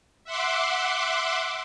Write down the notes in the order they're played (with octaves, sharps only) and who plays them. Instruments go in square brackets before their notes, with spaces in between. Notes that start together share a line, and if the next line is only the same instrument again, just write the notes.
[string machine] E5 F#5 C6 D6